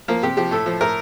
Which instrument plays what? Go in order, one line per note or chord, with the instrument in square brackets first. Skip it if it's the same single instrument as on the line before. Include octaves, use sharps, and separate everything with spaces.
[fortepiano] F3 A#3
C3 G4
F3 G4
A2 A4
F3
A2 A#4